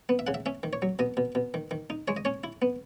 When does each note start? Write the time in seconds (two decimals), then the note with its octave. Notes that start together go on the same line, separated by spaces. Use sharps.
0.09 B3
0.19 E5
0.27 C#3 F#5
0.34 E5
0.46 C#4 E5
0.63 D#3
0.73 C#5
0.82 F#3
0.99 B2 D#5
1.17 B2
1.35 B2
1.54 D#3
1.71 D#3
1.90 D#4
2.08 G#3 C#5
2.17 D#5
2.25 C#4 C#5
2.44 E4
2.62 B3